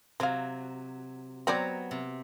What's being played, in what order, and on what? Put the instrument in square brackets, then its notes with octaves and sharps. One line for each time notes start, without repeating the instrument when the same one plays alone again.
[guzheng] C3 F#3 [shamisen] C5 F5
[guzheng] F#3 B3 A#5 [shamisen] C4 C5 D5
[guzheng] C3